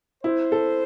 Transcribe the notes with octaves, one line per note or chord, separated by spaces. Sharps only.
E4 C5
A4